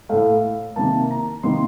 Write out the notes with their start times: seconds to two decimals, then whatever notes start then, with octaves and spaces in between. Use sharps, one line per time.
0.09 A2 A3 F5
0.76 C3 D#3 A#3 A5
1.11 A#5
1.43 C3 D#3 A#3 C6